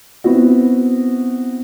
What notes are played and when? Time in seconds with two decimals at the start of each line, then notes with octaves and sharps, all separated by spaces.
0.24 B3 C4 E4 F#4